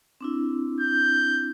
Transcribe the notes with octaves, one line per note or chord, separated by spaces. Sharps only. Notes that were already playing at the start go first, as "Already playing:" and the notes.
C4 D4 E4
G6